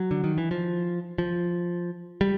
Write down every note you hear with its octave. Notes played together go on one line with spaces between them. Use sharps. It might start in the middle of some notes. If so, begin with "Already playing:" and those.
Already playing: F#3
D3
D#3
E3
F3
F3
G3